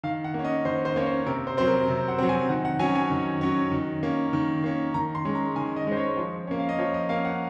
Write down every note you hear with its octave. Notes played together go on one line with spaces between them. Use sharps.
D#3 F5
F#5
A#3 C#4
D#5
D#3 C5
C5
A#3 C#4 C#5
C5
C3 A#4
C5
F#3 C4 C5
A#4
C3
F#5
F#3 C4
G#5
D#3 F#5
F#5
F#3 C#4 G#5
G#5
D#3
F#3 C#4
D#3
A#3 C#4
D#3
A#3 C#4
D#3 A#5
C6
G#3 C#4
A#5
D#3 G#5
D#5
G#3 C#4 C5
C#5
F3
A#3 C#4
F5
D#5
F3 C#5
D#5
A#3 C#4 F5
F#5